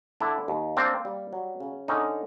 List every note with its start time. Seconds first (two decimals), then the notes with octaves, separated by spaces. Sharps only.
0.20 D3 D4 E4
0.48 D#2
0.77 A#3 C4 D4
1.05 G3
1.33 F#3
1.60 C#3
1.88 D3 C#4 D#4